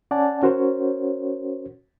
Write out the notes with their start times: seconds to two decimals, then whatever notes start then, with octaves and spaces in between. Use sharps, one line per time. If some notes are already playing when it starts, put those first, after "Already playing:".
0.11 C#4 D5 F#5 G#5 A5
0.43 C#4 F#4 A#4 C5 C#5